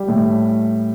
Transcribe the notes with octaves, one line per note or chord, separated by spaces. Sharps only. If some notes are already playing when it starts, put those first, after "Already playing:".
Already playing: G3
A2